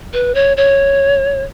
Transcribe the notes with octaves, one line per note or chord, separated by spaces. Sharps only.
B4
C#5
C#5